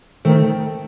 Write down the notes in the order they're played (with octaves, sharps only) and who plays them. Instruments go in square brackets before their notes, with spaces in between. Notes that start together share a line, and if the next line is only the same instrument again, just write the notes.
[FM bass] D#3 [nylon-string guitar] A3 C4